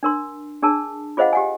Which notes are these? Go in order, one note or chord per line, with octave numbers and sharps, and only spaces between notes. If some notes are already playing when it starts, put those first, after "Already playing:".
D4 A#4 C6
D4 G#4 A#4 A5
F4 G#4 C5 D#5 F5 F#5
G4 F#5 G#5